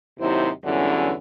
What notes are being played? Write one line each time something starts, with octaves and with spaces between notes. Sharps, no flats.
D#2 C3 F#3 D#4 E4 C5
E2 G2 D3 E3 F#3 C#4